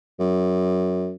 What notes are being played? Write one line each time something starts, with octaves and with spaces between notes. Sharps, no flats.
F#2